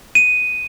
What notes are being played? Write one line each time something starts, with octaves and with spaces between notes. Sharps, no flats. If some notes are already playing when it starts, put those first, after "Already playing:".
D#7